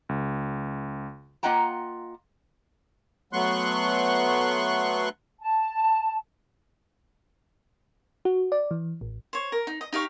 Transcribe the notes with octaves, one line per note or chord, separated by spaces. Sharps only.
C#2
A#3 F4 D#5 F#5 G5 A#5
F#3 A3 B3 C6 C#6 F#6
A5
F#4
D5
E3
A1
C5 C#5
A#4
D#4
D#5
D#4 G4 F5 C#6